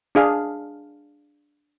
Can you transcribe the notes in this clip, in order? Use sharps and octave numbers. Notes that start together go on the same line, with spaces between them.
D4 G#4 F5